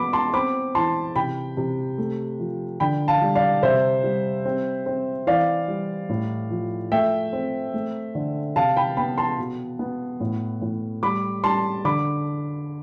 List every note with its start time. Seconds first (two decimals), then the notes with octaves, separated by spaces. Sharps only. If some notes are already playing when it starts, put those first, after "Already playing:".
Already playing: B2 B3 B5 D6
0.13 A5 C6
0.34 C4 B5 D6
0.75 E3 A5 C6
1.16 C3 G5 B5
1.57 C3
1.98 A3
2.40 F3
2.80 D3 G5 B5
3.08 F5 A5
3.22 G3
3.35 D5 F5
3.63 C3 C5 E5
4.03 G3
4.45 C4
4.86 C4
5.27 E3 D5 F5
5.68 G3
6.09 A2
6.51 F3
6.92 A3 E5 G5
7.33 C4
7.74 A3
8.15 D3
8.56 C3 F5 A5
8.76 G5 B5
8.97 B3 G5 B5
9.18 A5 C6
9.39 B2
9.79 B3
10.20 A2
10.62 A2
11.03 G3 B5 D6
11.44 G3 A5 C6
11.85 D3 B5 D6